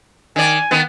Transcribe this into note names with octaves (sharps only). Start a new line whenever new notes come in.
D#3 D5 G#5
D#3 B3